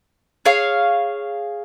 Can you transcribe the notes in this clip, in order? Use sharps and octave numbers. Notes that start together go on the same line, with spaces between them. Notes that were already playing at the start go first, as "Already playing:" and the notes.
G#4 C#5 F5